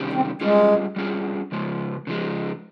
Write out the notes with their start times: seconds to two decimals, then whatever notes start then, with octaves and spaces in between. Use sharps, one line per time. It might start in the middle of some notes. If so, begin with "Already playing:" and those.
Already playing: C3 D#3 G3 C#4 G4
0.13 C4
0.41 G3 G#3 C#4 F4 G#4
0.96 G3 C#4 F4 G#4
1.52 C#3 F3 G#3
2.07 C#3 F3 G#3